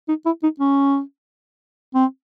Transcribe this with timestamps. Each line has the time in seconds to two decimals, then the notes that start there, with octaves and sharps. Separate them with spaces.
0.09 D#4
0.26 E4
0.43 D#4
0.60 C#4
1.95 C4